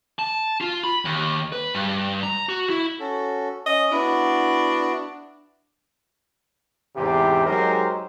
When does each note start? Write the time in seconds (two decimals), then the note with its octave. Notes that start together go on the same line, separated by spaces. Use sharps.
0.19 A5
0.61 F4
0.84 B5
1.05 D#2
1.52 B4
1.75 G2
2.23 A#5
2.49 F#4
2.70 E4
3.00 C#4 F#4 A4
3.66 C#4 D#5
3.92 B3 D4 E4 F#4
6.96 E2 G#2 C3 E3 G4
7.47 F#3 G#3 D#4 G4 A#4 C5